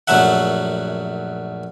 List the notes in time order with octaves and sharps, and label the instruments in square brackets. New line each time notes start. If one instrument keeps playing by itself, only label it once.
[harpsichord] A#1 F#2 F#3 A3 E5 F#5